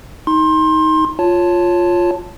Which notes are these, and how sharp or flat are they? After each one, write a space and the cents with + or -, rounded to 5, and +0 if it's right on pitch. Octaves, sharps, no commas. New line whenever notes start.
D#4 +20 C6 +25
F4 +5 C#5 +0 A5 +0